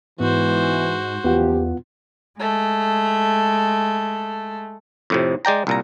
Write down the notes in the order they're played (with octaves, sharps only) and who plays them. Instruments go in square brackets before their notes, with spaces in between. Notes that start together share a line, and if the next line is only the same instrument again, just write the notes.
[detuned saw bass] G#2 [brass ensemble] E3 [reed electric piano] B3 [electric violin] F#4 C5
[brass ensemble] F#1 F3 G4 [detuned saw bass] E2 [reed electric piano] B3 F4 F#5
[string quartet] G#3 A3
[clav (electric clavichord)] F2 A2 C3
G#3 D5 G5 A#5
C2 A#2 A#5